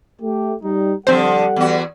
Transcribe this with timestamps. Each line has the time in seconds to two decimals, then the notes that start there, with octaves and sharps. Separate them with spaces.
0.22 A3 G4
0.63 G3 D#4
1.07 D3 F3 G3 C4 A4 C5 F#5
1.56 E2 F#4